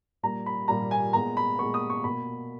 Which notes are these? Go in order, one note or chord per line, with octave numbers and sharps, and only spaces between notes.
A#2 G3 A#3 A#5
B5
A#2 G3 A#3 A#5
G#5
A#2 G#3 B3 A#5
B5
A#2 G#3 B3 C#6
D#6
C#6
B2 A#3 B5